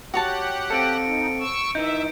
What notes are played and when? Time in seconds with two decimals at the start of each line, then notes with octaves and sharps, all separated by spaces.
0.14 F#4 G4 C#5 F#5 A5
0.70 C4 A4 C#7 D7
1.06 D#4
1.39 C#6 E6
1.75 E3 D#4 E5 G6